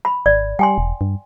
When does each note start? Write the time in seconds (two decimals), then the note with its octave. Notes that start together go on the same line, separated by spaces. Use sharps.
0.05 B5
0.26 G#1 D5
0.59 G3 G5 G#5 C6
0.78 E1
1.01 G2